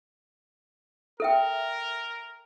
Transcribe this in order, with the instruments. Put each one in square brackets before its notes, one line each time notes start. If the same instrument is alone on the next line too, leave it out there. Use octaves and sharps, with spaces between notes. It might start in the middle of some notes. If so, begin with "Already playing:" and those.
[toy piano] A4 E5 G5 [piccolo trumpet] A#4